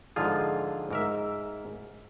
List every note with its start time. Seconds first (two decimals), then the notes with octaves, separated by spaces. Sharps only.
0.16 G#2 D3 F3 F4 G#4
0.91 G#2 A#4 E5